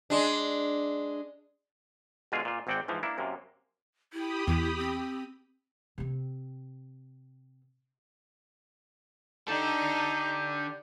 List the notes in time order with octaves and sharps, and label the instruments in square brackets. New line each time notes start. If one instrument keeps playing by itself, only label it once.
[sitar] G#3 D4
[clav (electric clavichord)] B2 D3 G#3 F4 G#4
A#2 F4
G#1 G#2 C4 D5 F#5 G5
G#2 E3 F3
A#3 D4 E4
F#2 C3 A#3
[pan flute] E4 [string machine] G4 B5 D#6
[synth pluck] E2 [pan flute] E4
[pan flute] C4
[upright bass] C3 C4
[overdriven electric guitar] D4 A4 [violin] D#4 [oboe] G4